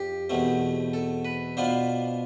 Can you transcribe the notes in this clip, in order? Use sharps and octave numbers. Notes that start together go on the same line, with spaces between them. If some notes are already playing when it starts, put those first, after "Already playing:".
Already playing: F2 G4
E2 B2 A3 C4
A4
B4
B2 B3 D4 F4 C5